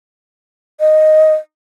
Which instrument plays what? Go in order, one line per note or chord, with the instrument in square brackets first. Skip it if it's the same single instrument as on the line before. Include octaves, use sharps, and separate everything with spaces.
[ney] D#5